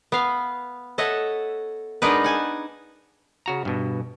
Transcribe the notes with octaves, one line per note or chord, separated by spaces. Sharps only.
B3 F5
A4 C#5 D#5 E5 F#5
G#3 B3 D4 D#4 A#4 B4
F#5 G#5 A5
C#3 F#4 A#5
G2 B2